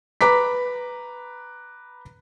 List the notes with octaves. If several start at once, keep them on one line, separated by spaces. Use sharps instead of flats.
B4 A#5 D6 B6